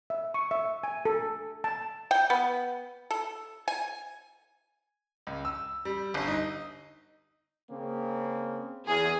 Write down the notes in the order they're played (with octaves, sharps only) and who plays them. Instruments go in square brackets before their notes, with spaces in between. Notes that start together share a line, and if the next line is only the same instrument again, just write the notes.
[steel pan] E5
C#6
E5
G#5
A4
A5
[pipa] G5
B3
A4
G#5
[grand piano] C#2
E6
G3
G1
D#4
[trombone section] C#3 A#3 C4
[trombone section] E2 [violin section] G#4